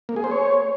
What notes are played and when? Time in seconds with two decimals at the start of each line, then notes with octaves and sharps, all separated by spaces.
0.09 A#3
0.16 G#4
0.24 C5
0.31 C#5